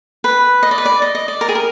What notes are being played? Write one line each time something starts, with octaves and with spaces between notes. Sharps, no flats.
B4
D#5
D5
B4
D5
D#5
D#5
D5
A#4
G#4
A#4